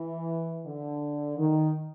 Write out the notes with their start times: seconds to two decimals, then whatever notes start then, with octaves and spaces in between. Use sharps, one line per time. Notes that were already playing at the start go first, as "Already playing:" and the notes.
Already playing: E3
0.66 D3
1.38 D#3